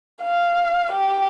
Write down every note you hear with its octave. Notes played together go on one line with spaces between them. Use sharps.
F5
G4